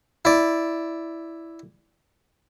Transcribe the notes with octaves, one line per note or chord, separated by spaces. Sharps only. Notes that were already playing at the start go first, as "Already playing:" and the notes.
E4 D5